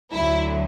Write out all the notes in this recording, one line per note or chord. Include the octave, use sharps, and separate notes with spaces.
D2 D3 F#3 E4